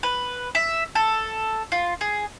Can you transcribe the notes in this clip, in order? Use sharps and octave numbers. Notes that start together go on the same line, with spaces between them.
B4
E5
A4
F4
G#4